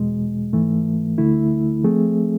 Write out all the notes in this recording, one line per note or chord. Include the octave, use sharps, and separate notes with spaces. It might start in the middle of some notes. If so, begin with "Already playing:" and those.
Already playing: E2 B2 G#3
G#2 E3 A3
D2 D3 A3 E4
F3 A3 C4 G#4